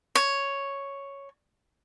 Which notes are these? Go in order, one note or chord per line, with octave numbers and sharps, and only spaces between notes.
C#5